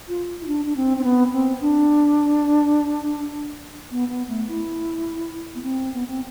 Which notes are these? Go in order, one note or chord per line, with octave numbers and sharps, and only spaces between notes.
F4
E4
D4
D4
C4
C4
B3
C4
D4
B3
B3
A3
E4
B3
C4
B3
C4